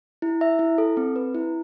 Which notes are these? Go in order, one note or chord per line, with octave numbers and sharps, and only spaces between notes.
E4
E5
E4
A4
C4
B4
E4